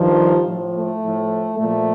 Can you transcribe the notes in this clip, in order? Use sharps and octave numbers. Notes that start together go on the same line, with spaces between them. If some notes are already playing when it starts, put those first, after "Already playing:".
Already playing: G2 D#3 F3
A2 F3
A3
A2 F3
A#2 F3 A3